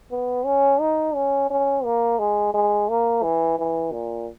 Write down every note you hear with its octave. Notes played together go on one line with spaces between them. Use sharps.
B3
C#4
D#4
C#4
C#4
A#3
G#3
G#3
A#3
E3
E3
A#2